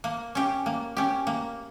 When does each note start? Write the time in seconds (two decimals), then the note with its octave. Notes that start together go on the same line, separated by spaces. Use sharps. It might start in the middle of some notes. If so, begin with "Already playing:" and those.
0.04 A#3
0.35 C#4 G4
0.66 A#3
0.97 C#4 G4
1.27 A#3